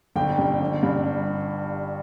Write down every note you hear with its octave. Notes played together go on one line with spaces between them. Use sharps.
G1 G5
G2
G1
G2